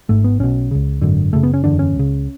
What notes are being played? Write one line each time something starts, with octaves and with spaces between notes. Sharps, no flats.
G#1 G#2 A3
B3
B1 B2 C#4
C#2 C#3
G#1 F#2 D3
F#1 F#2 C#3 A3
B3
C#4
F#1 E2 D3 D4
C#4
C#2 C#3